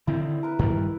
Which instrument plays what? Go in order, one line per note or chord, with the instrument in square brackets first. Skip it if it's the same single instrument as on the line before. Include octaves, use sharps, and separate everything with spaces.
[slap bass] D3 D#3 C4 [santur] E4
[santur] A#4 B4
[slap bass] G2 D#3 G3